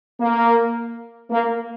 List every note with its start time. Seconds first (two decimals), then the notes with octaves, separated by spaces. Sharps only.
0.19 A#3
1.29 A#3